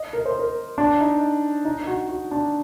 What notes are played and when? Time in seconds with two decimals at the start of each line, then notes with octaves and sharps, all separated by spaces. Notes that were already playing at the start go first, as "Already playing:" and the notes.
Already playing: D#5
0.13 A#4
0.25 C5
0.39 A#4
0.78 D4
1.00 D#4
1.65 D#4
1.87 F#4
2.09 F#4
2.31 D4